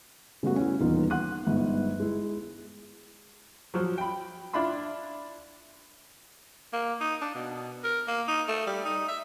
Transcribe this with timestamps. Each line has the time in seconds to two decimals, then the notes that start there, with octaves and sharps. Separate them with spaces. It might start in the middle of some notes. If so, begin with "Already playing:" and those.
0.43 C#3 G3 A3 B3 F#4
0.56 C#4 E4
0.81 D#1 E2 B3 D#4 F4
1.10 F#5 C6 F#6 D#7
1.47 G1 G#2
2.00 G#3 E4
3.74 F3 F#3
3.98 G5 B5
4.53 D4 E4 F4 B5 C6
6.73 A#3
7.00 D#4
7.22 D4
7.35 B2
7.84 A#4
8.08 A#3
8.28 D#4
8.48 A3
8.67 G3
8.85 D#4
9.08 E5